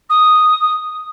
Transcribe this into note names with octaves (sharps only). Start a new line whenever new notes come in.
D#6